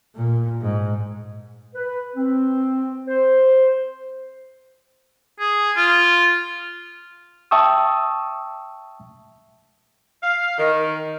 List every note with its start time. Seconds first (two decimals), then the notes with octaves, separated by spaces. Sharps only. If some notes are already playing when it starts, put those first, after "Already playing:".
0.15 A#2
0.62 G#2
1.73 B4
2.16 C4
3.08 C5
5.40 G#4
5.76 F4
7.51 E5 G5 A5 C#6 D#6 E6
10.23 F5
10.58 D#3